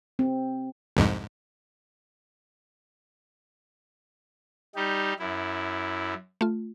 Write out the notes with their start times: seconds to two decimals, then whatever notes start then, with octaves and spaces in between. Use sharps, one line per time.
0.19 C4
0.97 C2 F2 G#2
4.75 G3 D#4 G4
5.19 F#2 E4
6.41 A3 F4